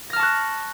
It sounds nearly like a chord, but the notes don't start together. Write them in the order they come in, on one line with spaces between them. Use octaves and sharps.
A#6 F6 A5 C#6 F#6